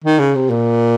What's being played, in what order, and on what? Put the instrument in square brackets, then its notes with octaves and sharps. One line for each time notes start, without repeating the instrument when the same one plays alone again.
[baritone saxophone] D#3
C#3
C3
A#2